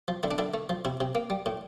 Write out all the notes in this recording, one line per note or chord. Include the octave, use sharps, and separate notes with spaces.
F3
D3 E4
D4
D3 E4
A3
F3
C3 E4
C3
A#3
G3
A2